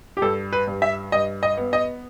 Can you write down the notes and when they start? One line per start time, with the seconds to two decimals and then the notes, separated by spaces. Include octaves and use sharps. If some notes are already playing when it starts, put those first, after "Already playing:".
0.17 G4
0.22 G2 A4
0.53 B4
0.67 G2
0.82 E5
1.12 G2 D#5
1.43 D#5
1.57 B3
1.73 D#5